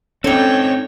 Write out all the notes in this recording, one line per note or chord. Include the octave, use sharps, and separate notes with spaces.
C4 C#4 D#4 A4 C#5 D5 G5